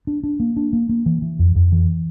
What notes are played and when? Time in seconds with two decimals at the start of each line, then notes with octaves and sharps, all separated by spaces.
0.07 D4
0.23 D4
0.40 A#3
0.56 D4
0.73 A#3
0.89 A#3
1.06 E3
1.22 E3
1.39 F2
1.56 F2
1.72 E3